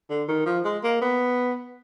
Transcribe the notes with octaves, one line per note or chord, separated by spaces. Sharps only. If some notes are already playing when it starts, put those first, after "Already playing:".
D3
D#3
F3
G#3
A#3
B3